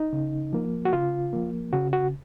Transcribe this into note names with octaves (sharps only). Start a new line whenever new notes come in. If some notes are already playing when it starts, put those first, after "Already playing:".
Already playing: D#4
C#3
F3 A#3
F#4
C#3 F4
F3 A#3
C#3 F#4
F#4